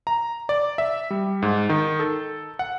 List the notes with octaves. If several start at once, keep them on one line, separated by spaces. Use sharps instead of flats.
A#5
D5
E5
G3
G#2
D#3
A4
F#5